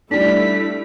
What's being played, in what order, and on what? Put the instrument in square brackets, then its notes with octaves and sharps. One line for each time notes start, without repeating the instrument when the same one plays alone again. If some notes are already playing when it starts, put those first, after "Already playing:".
[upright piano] G3 D4 [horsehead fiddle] A3 E4 [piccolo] B6